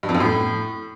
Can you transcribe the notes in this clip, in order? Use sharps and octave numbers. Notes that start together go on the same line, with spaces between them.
G2
F2
F#2
A2